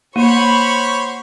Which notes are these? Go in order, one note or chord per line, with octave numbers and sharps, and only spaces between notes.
A#3 F#4 C5 C#5 B5 C#6